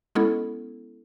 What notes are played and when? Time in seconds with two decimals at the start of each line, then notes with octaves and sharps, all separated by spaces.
0.15 G#3 B3 C#4 E4 A4